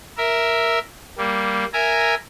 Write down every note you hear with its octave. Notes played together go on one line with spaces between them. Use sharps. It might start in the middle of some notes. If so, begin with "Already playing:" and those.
A#4 E5
G3 A#3
A#4 E5 G#5 A#5